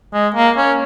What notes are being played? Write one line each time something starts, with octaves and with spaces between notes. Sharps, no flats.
G#3
A#3
C#4